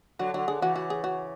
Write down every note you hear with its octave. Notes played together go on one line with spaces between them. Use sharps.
D3 F#3 F#4
D3 F#3 F#4
D3 G#4
C#3 E3 F#4
F#4
G#4
F#4